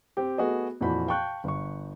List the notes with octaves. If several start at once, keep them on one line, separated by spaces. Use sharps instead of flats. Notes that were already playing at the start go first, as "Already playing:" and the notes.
C4 G4
A3 B3 F#4 G#4 D#5
F2 A#2 E3 F#4 B5 G6
F5 G5 A5 C#6 F#6 G6
G1 C#6